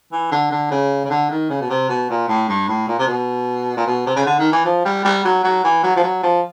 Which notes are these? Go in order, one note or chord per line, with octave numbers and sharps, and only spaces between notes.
E3
D3
D3
C#3
C#3
D3
D#3
C#3
B2
C3
B2
A#2
A2
G2
A2
A#2
C3
B2
A#2
B2
C3
C#3
D3
D#3
E3
F3
G3
G3
F#3
F#3
E3
F#3
F3
F#3
F3